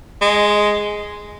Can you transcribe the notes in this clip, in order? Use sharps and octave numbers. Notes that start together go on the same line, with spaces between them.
G#3